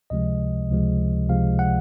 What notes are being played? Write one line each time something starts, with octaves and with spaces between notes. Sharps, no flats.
C#2 C3 F3 G#3 D#5
C#2 C3 F3 G#3
C#2 C3 F3 G#3 F5
F#5